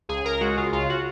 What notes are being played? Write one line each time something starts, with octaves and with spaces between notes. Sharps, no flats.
C#2 G#4
C#2 A#4
G#3 F#4
C#3 F4
C#2 F4
F#4